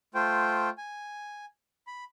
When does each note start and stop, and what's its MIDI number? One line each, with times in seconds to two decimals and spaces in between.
0.15 0.69 57
0.15 0.69 65
0.15 0.69 72
0.15 0.69 79
0.78 1.45 80
1.87 2.04 83